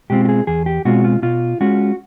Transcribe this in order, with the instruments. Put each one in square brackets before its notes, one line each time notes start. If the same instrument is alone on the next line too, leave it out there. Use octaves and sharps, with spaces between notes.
[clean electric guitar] B2 G#3 C4 F4 G4
G4
G#4
E2 G#4
G4
B2 G#3 C4 F4 F#4
F4
B2 F4
G#3 C#4 F4 F#4